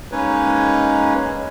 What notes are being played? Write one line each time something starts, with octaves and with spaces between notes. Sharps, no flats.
G#3 A#3 C#4 D#4 B4 C#5